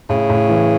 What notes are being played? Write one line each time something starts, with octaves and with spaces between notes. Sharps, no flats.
A2 C#3
A2
E3